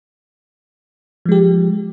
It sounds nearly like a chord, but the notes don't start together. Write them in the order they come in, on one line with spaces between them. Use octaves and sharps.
F3 G#3 G4